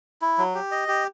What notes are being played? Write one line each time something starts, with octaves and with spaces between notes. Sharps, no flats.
E4
F#3
G4
D#5
G4